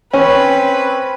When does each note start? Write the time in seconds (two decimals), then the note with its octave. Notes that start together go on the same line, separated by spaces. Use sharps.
0.14 C4 C#4 B4